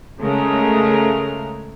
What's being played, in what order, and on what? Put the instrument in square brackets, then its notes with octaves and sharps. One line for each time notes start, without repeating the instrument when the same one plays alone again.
[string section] C#3 G#3 A3 A#4